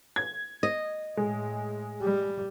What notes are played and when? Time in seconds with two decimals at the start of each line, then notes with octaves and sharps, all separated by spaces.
0.16 G#6
0.63 D#5
1.17 A2 G#3
2.02 G3